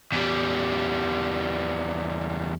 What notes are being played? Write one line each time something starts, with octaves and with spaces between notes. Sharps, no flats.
E2 G3